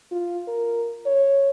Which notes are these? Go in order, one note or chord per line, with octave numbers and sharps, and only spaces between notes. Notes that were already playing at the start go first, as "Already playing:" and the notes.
F4
A#4
C#5